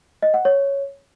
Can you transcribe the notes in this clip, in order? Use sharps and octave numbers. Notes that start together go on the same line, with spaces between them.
D#5
F#5
C#5